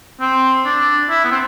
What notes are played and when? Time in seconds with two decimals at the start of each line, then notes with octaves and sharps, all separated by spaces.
0.20 C4
0.66 D4
1.09 E4
1.24 B3
1.31 C4